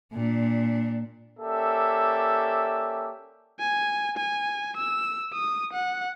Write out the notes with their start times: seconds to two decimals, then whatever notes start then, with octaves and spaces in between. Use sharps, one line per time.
0.13 A#2 D4
1.39 A#3 C#4 G4 A4 D5 E5
3.59 G#5
4.17 G#5
4.77 E6
5.33 D#6
5.73 F#5